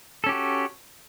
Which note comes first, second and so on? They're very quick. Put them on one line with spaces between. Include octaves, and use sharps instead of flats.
A4 C#4 G4 F#4